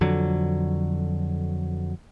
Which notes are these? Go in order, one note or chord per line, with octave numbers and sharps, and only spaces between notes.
F2 D3 F#3